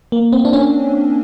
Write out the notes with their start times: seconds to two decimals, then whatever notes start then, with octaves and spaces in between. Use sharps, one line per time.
0.12 A#3
0.32 C4
0.45 D4
0.53 C#4